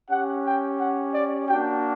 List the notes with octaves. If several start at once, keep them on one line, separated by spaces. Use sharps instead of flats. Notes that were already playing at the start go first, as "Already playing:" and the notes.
C#4 G4 F#5
G5
F#5
D5
A#3 D4 F#4 G5